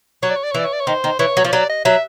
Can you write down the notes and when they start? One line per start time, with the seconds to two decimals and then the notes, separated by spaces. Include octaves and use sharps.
0.23 F#3 C#5
0.30 D5
0.36 C#5
0.44 D5
0.51 C#5
0.55 E3 D5
0.65 C#5
0.73 D5
0.80 C#5
0.87 D#3 C5
1.04 D#3
1.19 E3 C#5
1.37 F#3
1.45 F3
1.48 C#5
1.52 F#3 D5
1.69 D#5
1.85 F#3 E5